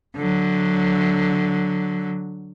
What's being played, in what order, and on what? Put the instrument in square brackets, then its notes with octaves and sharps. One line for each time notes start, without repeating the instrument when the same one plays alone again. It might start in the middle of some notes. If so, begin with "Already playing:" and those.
[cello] D3 F#3